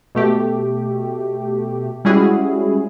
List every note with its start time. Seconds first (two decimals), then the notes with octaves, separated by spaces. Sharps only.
0.15 B2 A3 G4
2.05 G3 G#3 C#4 E4 F#4 G#4